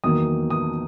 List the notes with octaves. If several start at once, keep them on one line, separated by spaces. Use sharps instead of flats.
E2 D#3 F#3 A#3 D#6
D#6